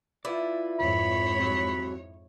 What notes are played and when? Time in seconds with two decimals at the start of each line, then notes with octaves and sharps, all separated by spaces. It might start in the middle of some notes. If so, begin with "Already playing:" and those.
0.25 E4 F4 B4 D5
0.80 F2 G#2 C#5 B5
1.39 C3 F#3